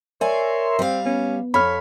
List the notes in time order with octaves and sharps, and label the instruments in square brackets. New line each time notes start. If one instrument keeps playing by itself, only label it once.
[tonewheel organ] A#4 E5 C6 [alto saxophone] C#5 [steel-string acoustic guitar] D5 G#5
[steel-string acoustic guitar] G3 F5 [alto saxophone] C4
[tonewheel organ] B3 [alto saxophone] C#4
[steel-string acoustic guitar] F2 [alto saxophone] C#5 [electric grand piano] B5 F6